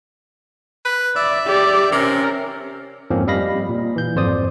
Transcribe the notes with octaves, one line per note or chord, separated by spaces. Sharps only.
B4
D5 E5
G4 D5
C3 C#4 A#4
F2 G#2 F3 A#3 C4 C#4
G3 D#5 F5 B5 A#6
A#2
E3 G6
G#1 F2 C5 D5 D#6